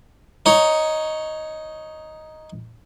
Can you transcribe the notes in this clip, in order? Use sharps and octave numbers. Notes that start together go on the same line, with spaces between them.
D#4 C#5